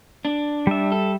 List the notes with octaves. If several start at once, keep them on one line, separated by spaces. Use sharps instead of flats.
D4
G3 E5
A4